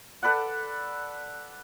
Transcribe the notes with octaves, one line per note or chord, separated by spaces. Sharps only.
A4 B4 D5 F#5